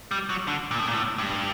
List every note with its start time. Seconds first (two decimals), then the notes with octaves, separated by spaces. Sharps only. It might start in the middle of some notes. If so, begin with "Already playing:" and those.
0.11 G3
0.29 F#3
0.47 D3
0.71 A#2
0.79 A2
0.87 A#2
0.94 A2
1.18 G2